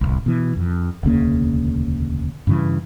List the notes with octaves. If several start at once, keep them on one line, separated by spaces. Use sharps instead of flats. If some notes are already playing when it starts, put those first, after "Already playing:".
D1 G1 C2
B2 E3
F2
E1 D2 C#3 A#3
G2 C#3 E3